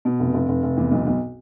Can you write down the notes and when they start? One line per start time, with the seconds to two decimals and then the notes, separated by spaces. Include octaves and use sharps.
0.05 B2
0.20 F1
0.34 F1
0.49 F1
0.63 F1
0.77 E2
0.91 B1
1.06 B1